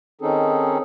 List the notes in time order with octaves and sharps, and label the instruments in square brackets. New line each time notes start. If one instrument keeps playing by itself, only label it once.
[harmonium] D#3 C4 C#4 D#4 G#4 A4